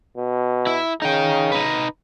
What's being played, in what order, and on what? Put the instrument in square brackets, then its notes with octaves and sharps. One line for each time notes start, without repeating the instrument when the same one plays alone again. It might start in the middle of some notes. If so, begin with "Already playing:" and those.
[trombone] B2
[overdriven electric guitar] E4
[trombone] C#3 [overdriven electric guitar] D#4 G5
[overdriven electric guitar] D#4 B4